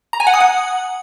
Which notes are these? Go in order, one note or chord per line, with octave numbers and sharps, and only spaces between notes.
A#5
G#5
F#5
D#6
F#5